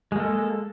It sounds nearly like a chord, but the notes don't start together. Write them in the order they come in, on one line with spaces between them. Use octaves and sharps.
G#3 A#3 A4